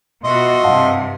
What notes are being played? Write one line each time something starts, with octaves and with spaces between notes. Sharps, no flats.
B2 F4 F#4 D#5 E5 C6
G2 C3 F5 F#5 A5